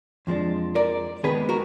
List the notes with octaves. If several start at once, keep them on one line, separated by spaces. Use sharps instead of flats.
F2 F3 G#3 D4
A#4 D5
D#2 D#3 G#3 B3 D#4 G#4 B4
F#4 A#4